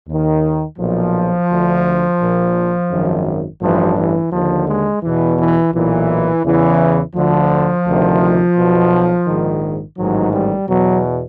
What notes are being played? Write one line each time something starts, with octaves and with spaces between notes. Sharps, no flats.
D#2 D#3
B1 A#2 F3
D2 D3
A#1 A#2
G#1 F#2 D#3
A1 G2 E3 F3
E3
D#2 D3 F3
G#3
E2 B2 E3
E3
B1 A#2 E3
E2 C#3 E3
D2 D3 F3
D2 C3 D#3
B1 B2
A#1 G#2 D#3
A1 G#2 D#3 F#3
G3
E2 B2 F#3